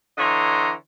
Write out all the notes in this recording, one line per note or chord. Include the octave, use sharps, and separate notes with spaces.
D3 E3 C#5 D#5 A#5 C6